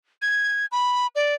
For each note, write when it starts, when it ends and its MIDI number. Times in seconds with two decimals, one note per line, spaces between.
0.22 0.66 92
0.72 1.07 83
1.15 1.34 74